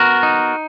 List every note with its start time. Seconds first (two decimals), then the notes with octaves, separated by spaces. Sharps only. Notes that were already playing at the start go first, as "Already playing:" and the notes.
Already playing: B3 F#4 A#4
0.23 D#4